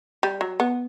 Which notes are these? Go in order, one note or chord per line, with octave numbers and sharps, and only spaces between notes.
G3
F#3
B3